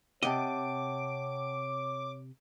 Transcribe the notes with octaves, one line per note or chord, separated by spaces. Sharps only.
C3 C#5 D#5 F#5 G5 A5 D6